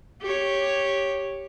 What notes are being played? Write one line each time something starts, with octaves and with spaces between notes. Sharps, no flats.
G4 C#5